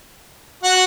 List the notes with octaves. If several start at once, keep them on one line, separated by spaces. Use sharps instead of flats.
F#4 F#5